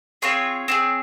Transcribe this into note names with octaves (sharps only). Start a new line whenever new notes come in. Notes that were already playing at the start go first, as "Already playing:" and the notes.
C4 F4 G#4 C#5
C4 F4 G#4